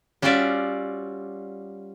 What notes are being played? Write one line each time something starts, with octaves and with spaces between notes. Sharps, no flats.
G3 C#4 F4 F#4 D5 E5